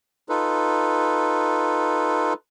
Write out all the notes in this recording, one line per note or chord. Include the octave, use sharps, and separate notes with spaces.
D#4 F4 A4 B4